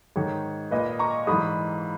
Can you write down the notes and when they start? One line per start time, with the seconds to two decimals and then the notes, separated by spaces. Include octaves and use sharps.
0.16 G#2 D#3 C#5
0.71 A#2 B4 D#5
0.99 A#5 C#6
1.27 G#2 E3 B5 D#6